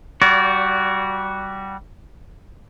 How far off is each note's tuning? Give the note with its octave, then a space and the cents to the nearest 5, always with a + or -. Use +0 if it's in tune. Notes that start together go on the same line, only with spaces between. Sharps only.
G3 -15 F#4 +0 D5 -35